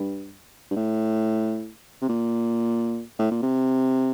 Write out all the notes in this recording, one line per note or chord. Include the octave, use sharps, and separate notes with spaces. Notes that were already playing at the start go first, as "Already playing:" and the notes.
Already playing: G2
G2
A2
C3
A#2
A2
A#2
C3